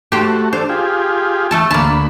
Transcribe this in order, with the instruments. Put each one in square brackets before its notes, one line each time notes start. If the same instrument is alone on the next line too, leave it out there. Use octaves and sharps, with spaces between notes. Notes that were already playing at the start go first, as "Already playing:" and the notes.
[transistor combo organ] A3 F#4 [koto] G4 C5
[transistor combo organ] D4 A4 [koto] C5
[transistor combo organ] F4 G4 G#4
[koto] A3 A4 A5
[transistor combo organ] D2 B5 [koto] A#3 A5